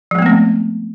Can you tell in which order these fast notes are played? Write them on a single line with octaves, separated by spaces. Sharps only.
F3 G#3 B3 A3 C4